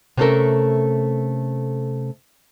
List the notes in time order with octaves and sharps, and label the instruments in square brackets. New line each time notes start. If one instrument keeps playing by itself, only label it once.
[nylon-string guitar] C3 A3 B3 C#4 A4 A#4